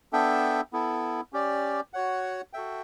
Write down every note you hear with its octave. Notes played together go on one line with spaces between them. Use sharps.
B3 D4 A4 E5 G5
B3 E4 A4
C#4 G4 D5
F#4 C#5 F#5
F#4 A4 E5 G5